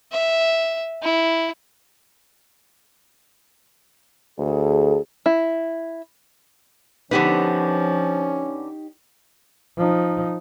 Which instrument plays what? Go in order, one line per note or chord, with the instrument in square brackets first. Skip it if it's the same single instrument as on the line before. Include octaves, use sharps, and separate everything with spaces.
[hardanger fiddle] E5
E4
[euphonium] D2 [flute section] G#4 A4
[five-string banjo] E4
[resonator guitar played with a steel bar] D3 B3 B4 [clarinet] F3 [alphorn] C#4 [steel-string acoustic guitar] D#4 G4 C#5
[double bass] F3 D#4